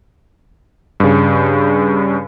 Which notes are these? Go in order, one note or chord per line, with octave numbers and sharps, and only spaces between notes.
G2 C#3